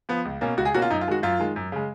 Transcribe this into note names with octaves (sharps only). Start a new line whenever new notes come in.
F3 B3
C#2
B2 A#3 C#4
C#2 F#4
G#4
B2 A#3 C#4 F#4
F4
F#2 D#4
F4
D#3 G#3 F#4
F#2 F4
D#3 G#3
F#2
C#3 G#3